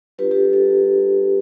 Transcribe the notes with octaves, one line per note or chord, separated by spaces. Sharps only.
G3 D4 F4 G4 B4
G4
A4
A4